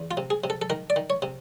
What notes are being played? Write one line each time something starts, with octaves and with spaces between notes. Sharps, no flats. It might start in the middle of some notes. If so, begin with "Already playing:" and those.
Already playing: E2
F4
C3
G#4
C3
A4
A4
D#3 A#4
D5
D#3
C#5
C3